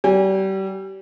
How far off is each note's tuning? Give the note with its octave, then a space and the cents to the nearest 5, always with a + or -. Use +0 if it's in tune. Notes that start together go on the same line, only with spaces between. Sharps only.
G3 -30 G#5 -45